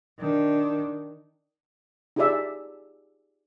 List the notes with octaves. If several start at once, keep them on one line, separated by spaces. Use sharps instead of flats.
D#3 D4
D#4 F4 G4 G#4 D5 E5